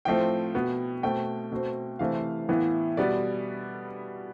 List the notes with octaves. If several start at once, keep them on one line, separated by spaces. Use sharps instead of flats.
A2 F3 A3 C4 G5
B2 B3
B2 A3 C4 G5
B2 A3 C4
C3 E3 A3 C4 F5
A2 E3 B3
B2 G3 B3 D5